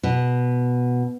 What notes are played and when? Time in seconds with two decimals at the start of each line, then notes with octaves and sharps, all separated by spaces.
0.03 B2